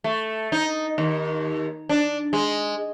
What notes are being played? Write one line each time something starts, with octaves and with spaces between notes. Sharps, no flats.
A3
D#4
D#2
D4
G#3